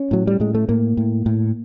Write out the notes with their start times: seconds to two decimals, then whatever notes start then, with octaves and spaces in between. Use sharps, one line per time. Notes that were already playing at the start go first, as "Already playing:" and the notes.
Already playing: C#4
0.11 A2 F#3
0.27 G3
0.40 A2 G#3
0.55 A3
0.69 A2 A#3
0.97 A2
1.26 A2